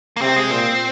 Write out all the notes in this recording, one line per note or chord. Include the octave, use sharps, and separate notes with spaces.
A#3
C3 C4
G#3
A#2 C4